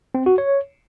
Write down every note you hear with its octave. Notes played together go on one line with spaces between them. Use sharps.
C4
F#4
C#5